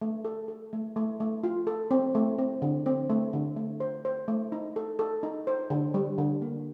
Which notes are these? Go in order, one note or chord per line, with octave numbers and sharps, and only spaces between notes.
A3
A4
A4
A3
A3
A3
F4
A4
C4
A3
C4
D3
C4
A3
D3
A3
C5
C5
A3
D#4
A4
A4
D#4
C5
D3
G3
D3
A#3